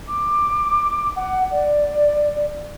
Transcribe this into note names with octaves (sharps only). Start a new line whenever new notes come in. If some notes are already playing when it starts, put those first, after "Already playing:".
D6
F#5
D5